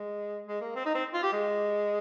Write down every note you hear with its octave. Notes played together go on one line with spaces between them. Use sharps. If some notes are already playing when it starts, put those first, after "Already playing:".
Already playing: G#3
G#3
A#3
C4
D#4
C4
F4
G4
G#3